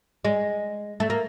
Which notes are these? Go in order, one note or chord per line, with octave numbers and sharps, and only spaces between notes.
G#3
A3
A#3